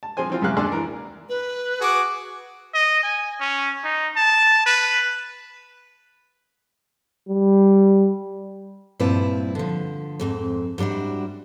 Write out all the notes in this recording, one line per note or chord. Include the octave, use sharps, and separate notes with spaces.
A5
F3 C4 G#4 C5 G#5
E3 C4 F4
F#2 C3 A#3 G#4 F5 F#6
D#2 D4 G#4 D5 C6 E6
E3 A#4
B4
F#4 G#4 D6
D#5
G#5
C#4
D#4
A5
B4
G3
G2 A#2 F3 C4 E4 B4
D3 F3
F2 G#2 C4
G#2 G3 D4 E4 F#4